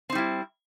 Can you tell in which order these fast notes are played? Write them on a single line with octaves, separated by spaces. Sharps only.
C4 D#4 G3 E4